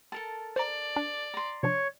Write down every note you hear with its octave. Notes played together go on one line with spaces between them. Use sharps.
A4 A#4 A5
C5 D5 A#5
D4
A#5 C6
C3 F3 D4 C#5